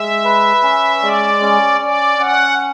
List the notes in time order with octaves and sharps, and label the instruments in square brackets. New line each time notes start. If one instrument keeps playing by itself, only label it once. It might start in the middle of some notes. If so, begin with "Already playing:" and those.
Already playing: [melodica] G#3 [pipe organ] E5
[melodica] B4
C#4
[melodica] G#3 [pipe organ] D5
[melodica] C#4
[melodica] C#4 [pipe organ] D5
[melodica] C#4 [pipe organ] F#5